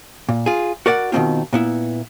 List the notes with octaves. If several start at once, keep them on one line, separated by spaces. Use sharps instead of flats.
A#2
F4 G#4
F#4 A#4 D5 E5 F#5
B2 D#3 G3 A#3 C4 F4
A#2 B3 E4